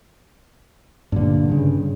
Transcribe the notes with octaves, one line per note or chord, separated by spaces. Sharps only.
G2 A#2 D3
G2 C#3